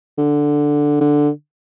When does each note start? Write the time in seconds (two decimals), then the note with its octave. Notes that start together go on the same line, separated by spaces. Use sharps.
0.18 D3
1.01 D3